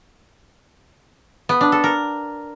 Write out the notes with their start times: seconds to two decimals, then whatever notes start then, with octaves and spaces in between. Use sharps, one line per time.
1.49 B3
1.61 D4
1.72 A4
1.84 A#4